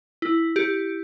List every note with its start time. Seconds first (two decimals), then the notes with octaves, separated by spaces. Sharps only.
0.22 E4
0.56 G4